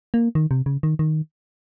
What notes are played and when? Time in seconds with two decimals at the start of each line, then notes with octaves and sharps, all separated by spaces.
0.14 A#3
0.35 D#3
0.51 C3
0.66 C#3
0.83 D#3
0.99 D#3